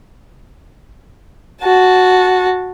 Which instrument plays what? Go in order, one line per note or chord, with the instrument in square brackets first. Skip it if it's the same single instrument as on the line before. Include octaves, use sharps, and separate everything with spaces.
[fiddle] F#4 A5